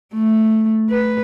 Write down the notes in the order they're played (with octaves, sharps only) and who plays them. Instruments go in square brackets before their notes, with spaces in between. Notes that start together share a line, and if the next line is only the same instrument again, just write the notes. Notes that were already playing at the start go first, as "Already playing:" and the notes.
[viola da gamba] A3
B4